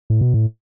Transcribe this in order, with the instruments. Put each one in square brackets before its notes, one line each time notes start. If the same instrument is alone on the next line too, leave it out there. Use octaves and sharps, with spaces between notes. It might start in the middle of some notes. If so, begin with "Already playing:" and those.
[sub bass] A2
B2
A2